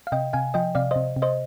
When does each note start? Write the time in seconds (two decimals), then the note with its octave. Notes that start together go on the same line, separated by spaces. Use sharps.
0.07 F5
0.12 C3 D#5 G5
0.33 C3 F5 G#5
0.54 F3 D#5 G5
0.75 C3 D5 F5
0.91 C3 C5 D#5
1.16 C3
1.22 C5 D#5